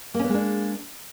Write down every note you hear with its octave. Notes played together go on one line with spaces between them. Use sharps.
G#3 A#3 B3 C#4 D4